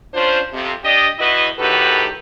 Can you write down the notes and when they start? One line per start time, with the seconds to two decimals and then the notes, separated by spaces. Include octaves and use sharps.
0.14 C#4 D4 F4 C5
0.52 F2 C3
0.84 D4 G4 D5 D#5
1.19 E2 E4 F#4 B4 D#5
1.59 A2 D#3 F#4 G4 A4 B4